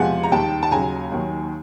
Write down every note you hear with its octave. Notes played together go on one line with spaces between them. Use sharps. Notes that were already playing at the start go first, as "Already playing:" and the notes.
Already playing: E2 C3 F3 G#3 F#5 G#5
A#5
D#2 D#3 G3 G5 A5
A5
D#2 C#3 F#3 G#5 A#5
D#2 D#3 F#3